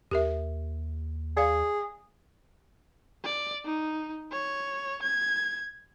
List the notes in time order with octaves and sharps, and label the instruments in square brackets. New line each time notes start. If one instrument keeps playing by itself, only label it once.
[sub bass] D#2 [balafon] G4 A#4 E5
[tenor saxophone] G#4 [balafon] D5 F5
[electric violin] D5
D#4
C#5
G#6